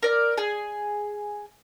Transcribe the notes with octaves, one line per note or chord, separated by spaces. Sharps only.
A#4 D5
G#4 G#5